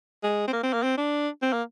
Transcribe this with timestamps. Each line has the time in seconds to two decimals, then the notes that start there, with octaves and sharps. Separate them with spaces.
0.23 G#3
0.48 C4
0.53 A#3
0.63 C4
0.73 A#3
0.83 C4
0.97 D4
1.42 C4
1.53 A#3